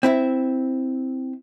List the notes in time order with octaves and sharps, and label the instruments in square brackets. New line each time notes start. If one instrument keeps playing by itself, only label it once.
[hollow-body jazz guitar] C4 E4 E5